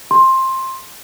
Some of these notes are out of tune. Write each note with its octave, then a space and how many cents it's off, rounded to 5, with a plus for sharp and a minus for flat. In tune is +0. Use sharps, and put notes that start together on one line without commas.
C6 +15